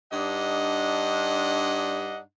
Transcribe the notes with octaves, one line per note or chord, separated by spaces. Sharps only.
G2 D4 D#4 D#5 F#5